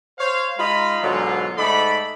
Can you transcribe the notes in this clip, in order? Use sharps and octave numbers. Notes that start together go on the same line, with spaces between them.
C5 C#5 F5
G#3 D#4 F4 D#5 B5
G#2 B2 D3 F#3 F4
G#2 A3 D#4 A4 D5 B5